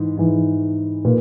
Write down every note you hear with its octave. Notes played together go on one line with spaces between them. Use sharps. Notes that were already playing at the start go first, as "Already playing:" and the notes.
Already playing: G#2 E3
G#2 E3
A#2 B4